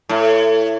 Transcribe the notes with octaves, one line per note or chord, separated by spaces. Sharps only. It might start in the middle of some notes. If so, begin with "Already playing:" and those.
A2